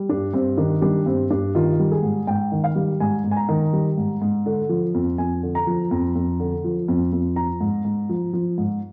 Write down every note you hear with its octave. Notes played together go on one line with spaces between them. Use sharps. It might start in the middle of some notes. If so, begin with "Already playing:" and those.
Already playing: G3
G2 D4
G2 C4
D#3 D4
G3 D4
G2 C4
G2 D4
D#3 F4
G3
G#4
G#2
G#2 G5
D#3
F5
G3
G#2 G#5
G#2
G#5
A#5
D#3
G3
G#2
G#2
D3
F3
F2
F2 G#5
D3
A#5
F3
F2
F2
D3
F3
F2
F2
F3 A#5
G#2
G#2
F3
F3
G#2